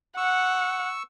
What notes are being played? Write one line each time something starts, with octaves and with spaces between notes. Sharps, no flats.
F#5 C#6 E6